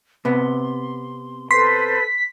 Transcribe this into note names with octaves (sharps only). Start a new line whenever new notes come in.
C3 B3 C6
A4 B4 C5 C6 B6